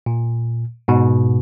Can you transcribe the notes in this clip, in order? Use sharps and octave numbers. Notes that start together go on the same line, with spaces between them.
A#2
G#2 B2